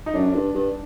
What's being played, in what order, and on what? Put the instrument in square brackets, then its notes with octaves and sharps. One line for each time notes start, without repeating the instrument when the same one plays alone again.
[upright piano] D#4
[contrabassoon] F#2 [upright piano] D4
[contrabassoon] F#2
G2
G2